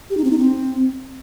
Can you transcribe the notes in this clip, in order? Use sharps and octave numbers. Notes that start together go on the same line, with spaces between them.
G4
D#4
C4
D#4
C4